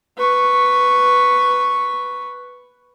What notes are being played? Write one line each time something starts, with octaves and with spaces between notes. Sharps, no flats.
B4 C#6